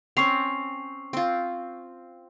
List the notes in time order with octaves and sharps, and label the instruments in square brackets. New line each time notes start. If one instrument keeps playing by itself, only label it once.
[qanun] C4 C#4 [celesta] C#6 C7 F7
[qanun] C4 F4